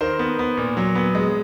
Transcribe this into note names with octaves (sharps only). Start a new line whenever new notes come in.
D#3 A#4 C5
B3
B3
A#2
F#3
B3
G#3